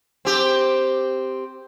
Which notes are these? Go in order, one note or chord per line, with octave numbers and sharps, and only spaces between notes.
C4 G4